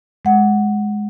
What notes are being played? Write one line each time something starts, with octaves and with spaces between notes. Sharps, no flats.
G#3 F#5